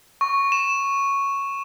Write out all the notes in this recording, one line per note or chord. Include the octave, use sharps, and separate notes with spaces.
C#6
E7